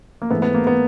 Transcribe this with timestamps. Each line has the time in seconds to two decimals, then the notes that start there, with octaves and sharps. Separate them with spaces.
0.22 A#3
0.30 G#2 E3 A3 B3
0.42 B3
0.54 A#3
0.67 B3